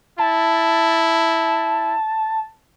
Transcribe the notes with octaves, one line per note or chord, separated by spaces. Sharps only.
E4 A5